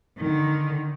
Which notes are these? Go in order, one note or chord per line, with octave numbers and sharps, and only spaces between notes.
D3 D#3